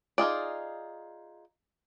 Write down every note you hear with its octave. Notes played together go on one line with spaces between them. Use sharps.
D#4 F4 G#4 D5